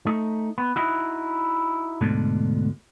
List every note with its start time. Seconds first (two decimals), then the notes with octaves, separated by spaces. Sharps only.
0.07 A3 D#4
0.58 B3
0.76 D#4 E4 F#4
2.01 D2 G#2 B2 D3